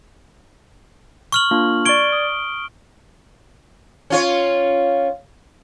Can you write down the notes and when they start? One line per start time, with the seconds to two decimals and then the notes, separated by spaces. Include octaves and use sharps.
1.32 C#6 F6 F#7
1.51 A#3 D4 F4
1.85 D5 C#6 G#6 D7 G7
2.12 D#6
4.10 C#4 F4 C#5